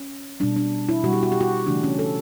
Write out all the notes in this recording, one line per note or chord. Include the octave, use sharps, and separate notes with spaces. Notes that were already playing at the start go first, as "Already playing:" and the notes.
Already playing: C#4
B2 G3 D4
D4
E4
B2 G3 F#4
G4
F#4
G4
F#4
C#3 E3 A3 D4
C#4
A4